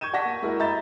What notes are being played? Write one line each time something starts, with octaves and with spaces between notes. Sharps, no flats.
C#6 G6 G#6 D#7 E7
D5 F#5 A5 C#6 A#6 B6
A#3
G#3 E4 F#4 A#4
D#5 E5 A#5 B5 G6 A6